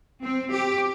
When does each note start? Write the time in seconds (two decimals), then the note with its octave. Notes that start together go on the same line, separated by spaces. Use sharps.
0.22 C4
0.52 G4